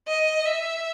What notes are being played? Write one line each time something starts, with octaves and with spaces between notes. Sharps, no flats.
D#5
E5